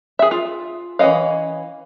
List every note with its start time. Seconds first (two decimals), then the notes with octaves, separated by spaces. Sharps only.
0.19 G#4 E5
0.31 F4
0.99 E3 C#4 C#5 D#5 F5